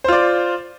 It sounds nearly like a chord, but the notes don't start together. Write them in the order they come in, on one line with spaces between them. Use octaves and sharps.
C5 F4 D5